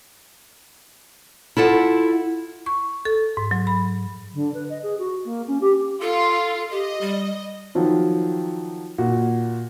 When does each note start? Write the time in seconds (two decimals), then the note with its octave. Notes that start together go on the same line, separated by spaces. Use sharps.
1.57 E4 F4 A4 F#5
2.66 C#6
3.05 A4
3.37 G#2
3.51 F#3
3.67 B5
4.34 D3
4.54 B4
4.70 D#5
4.83 G#4
4.99 F#4
5.25 A#3
5.48 C#4
5.61 G4
6.01 F4 A4
6.71 G4 D#5
7.01 G3
7.75 D#3 F3 F#3
8.98 A#2 F#4